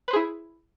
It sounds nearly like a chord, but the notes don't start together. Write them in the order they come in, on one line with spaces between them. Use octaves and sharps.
B4 C5 G#4 E4